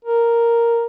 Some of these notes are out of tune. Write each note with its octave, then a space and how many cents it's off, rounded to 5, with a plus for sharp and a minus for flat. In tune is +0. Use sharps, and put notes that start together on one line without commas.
A#4 +0